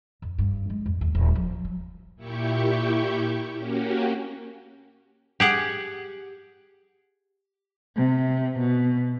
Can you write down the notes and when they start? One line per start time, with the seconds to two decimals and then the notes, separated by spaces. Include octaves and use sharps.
0.22 F2
0.38 G2
0.70 G#3
0.86 F2
1.01 D#2
1.15 D#1
1.35 F3
1.65 F#3
2.16 A#2 E4 G4 C#6 G6
3.56 A#3 C#4 F#4 G4
5.40 G4 G#4 F#5
7.96 C3
8.59 B2